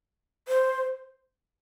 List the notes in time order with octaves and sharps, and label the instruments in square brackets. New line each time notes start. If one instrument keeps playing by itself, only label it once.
[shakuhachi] C5